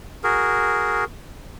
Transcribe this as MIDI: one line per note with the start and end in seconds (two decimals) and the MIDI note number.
0.24 1.04 66
0.24 1.04 68
0.24 1.04 70